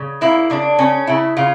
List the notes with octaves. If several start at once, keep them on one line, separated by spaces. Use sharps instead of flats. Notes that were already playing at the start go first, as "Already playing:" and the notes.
Already playing: C#3
A#3 E4
C#3 D4
C#3 C#4
C#3 E4
C#3 F4